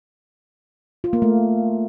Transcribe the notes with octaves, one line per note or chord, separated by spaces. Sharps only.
F4
A#3
A3